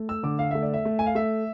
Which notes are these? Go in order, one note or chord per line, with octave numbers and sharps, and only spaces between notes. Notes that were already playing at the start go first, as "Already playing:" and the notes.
Already playing: A3
E6
D3 D6
F5
A3 E5
D5
E5
A3
G#5
F5
A3 E5